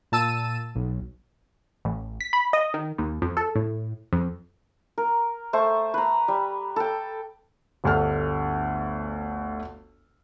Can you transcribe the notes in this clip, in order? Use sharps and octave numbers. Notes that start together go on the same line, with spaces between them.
A#2 A5 E6 D#7
B1
A1
B6
B5
D#5
D#3
D#2
F2
A4
A2
F2
A#4
A3 C5 C#6
B4 A#5
G3
A4 G5
G1 D2 A4 F6